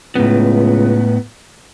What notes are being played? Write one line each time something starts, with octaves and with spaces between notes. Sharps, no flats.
C#2 A2 B3